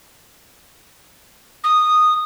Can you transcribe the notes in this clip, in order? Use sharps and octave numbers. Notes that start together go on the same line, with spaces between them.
D#6